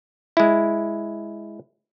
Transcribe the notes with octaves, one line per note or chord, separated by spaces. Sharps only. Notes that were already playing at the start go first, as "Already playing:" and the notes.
G#3 E4